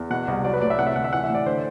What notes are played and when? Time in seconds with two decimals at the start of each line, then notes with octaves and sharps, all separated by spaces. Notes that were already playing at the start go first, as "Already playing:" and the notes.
Already playing: E2
0.10 B2 F#5
0.28 C2
0.44 F#3 D5
0.53 B4
0.61 A2 D5
0.70 E5
0.79 C3 F#5
0.86 E5
0.95 D2 F#5
1.04 E5
1.13 E3 F#5
1.24 E5
1.30 A2 D5
1.46 D3 C5